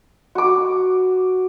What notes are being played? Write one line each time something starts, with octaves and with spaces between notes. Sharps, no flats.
F#4 D6